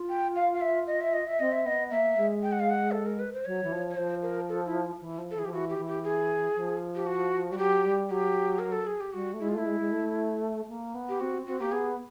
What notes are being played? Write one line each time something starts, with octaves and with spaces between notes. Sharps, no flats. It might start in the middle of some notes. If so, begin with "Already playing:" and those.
Already playing: F4
G5
F5
F5
E5
D#5
E5
D#5
E5
C4 D#5
E5
B3 D#5
A#3 E5
G#3
G5
F#5
F5
F#5
A4
A#4
B4
C5
F#3 C#5
E3
F3
C#5
F3 C5
A#4
A4
E4
E3
F3
A4
E3 G#4
F3 G4
E3 F#4
G4
E3
G4
G#4
F3
G4
F#4
G3 F#4
F#3 G4
G3
F#3 G4
A#4
A4
G#4
G4
G3 F#4
A3
G#3 E4
F4
A3 E4
G#3
G#3
A3
A#3
B3
G4
C4 F#4
C4 F#4
A#3 G4
B3 G#4